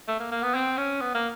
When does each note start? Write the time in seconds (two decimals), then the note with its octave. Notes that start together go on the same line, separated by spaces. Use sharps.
0.08 A3
0.19 A#3
0.31 A#3
0.43 B3
0.54 C4
0.77 C#4
1.01 B3
1.14 A#3